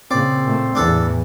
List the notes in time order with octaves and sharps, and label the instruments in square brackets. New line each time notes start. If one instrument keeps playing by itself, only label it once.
[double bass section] A#2 C#3 [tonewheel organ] C4 [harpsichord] D5
[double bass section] A#2 A3
[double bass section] E2 A2 E3 [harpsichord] D4 A4